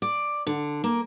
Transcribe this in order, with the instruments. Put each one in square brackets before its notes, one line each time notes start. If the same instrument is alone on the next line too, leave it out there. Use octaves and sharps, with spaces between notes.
[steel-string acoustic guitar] D5
D3
A#3